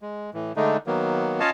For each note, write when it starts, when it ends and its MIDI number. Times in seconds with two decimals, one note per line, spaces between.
0.02 0.30 56
0.34 0.52 45
0.34 0.52 52
0.56 0.77 50
0.56 0.77 56
0.56 0.77 57
0.56 0.77 62
0.56 0.77 63
0.87 1.40 51
0.87 1.40 54
0.87 1.40 58
0.87 1.40 59
1.40 1.50 61
1.40 1.50 65
1.40 1.50 73
1.40 1.50 75
1.40 1.50 77
1.40 1.50 81